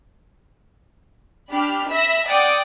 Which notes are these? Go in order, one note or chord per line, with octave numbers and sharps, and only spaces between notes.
D4 G4 B5 F6
E5 B5 E6 A#6
D5 F#5 G5 D#6